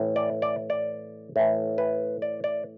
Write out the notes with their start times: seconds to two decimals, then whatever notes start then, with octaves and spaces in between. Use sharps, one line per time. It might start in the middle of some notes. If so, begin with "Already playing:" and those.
Already playing: A2 E3
0.16 D5
0.42 D5
0.70 D5
1.36 A2 E3
1.78 B4
2.22 D5
2.44 D5